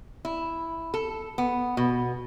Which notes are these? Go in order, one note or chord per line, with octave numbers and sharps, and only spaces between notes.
E4
A4
B3
B2